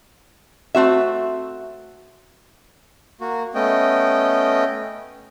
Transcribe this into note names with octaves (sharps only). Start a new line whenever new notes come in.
A3 C4 F#4 E5
A#3 F#4
A3 B3 C#4 D#5 G5